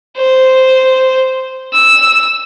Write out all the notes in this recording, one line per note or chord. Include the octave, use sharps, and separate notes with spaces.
C5
E6